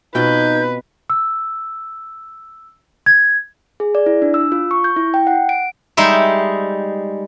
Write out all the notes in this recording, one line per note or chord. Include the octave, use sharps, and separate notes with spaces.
B2 C4 D#4 F4 B4 G6
E6
G#6
G#4
D5
E4
D4
E6
F4
C#6
G6
E4
G5
F#5
D7
G3 G#3 D#4 E5